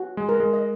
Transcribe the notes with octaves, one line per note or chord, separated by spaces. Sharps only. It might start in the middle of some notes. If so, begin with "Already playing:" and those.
Already playing: F#4
G#3
A#4
G#3
D#5